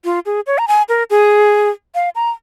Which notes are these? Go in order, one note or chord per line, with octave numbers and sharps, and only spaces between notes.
F4
G#4
C#5
A#5
G#5
A#4
G#4
F5
A#5